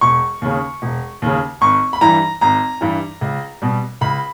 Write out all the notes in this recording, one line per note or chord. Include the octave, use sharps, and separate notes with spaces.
E1 C#6
D#2 C#3
E1
D#2 C#3
G#1 C#6
B5
G2 E3 G3 A#5
G#1 A#5
G2 E3 G3
C#2
B2 G3
C#2 B5